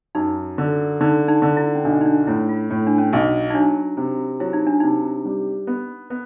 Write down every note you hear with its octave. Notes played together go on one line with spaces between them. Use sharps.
F#2 D#4
D3
D3 D#4
D#4
D3
E4
C#4
B1 D4
D#4
D4
A2 E4
F4
A2
D4
C#4
B1
D#4
F#3 D4
C3
F#3 E4
D#4
D4
C3 D#4
G3
B3
B3